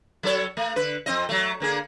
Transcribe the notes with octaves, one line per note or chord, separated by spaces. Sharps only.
F#3 A4 C#5
A3
D3 B4
F2 C4 D#5
F#3 A3
D3 A#3 G#4